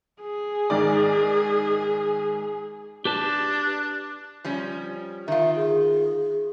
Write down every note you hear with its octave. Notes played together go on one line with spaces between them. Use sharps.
G#4
G#2 D#3 D5
D4 G4 B4 A5
F3 G3 C#4
D#3 F4 E5
G#4